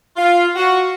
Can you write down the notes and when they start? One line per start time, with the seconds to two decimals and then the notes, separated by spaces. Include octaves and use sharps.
0.16 F4
0.56 F#4